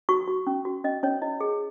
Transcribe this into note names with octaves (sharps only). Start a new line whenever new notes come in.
F#4 C#6
F#4
C#4
F#4
C#4 D#5
C#4 C#5
E4 D#5
G#4